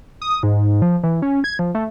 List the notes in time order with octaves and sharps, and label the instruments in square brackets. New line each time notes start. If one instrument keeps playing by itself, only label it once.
[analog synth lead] D#6
G#2
F3
E3
C#4
G#6
F3
A3